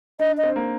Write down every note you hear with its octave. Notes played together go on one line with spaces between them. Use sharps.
D4 D#5
D#5
C4
A#3